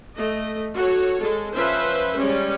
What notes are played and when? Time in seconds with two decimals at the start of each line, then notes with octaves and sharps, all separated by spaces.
0.14 A3 D#5
0.75 F#4 A4 C#5
1.20 G#3 A4
1.54 F3 C#4 B4 C5 E5
2.17 G3 G#3 C#4